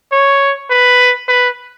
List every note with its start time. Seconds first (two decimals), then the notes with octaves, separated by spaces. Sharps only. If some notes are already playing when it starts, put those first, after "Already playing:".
0.12 C#5
0.70 B4
1.28 B4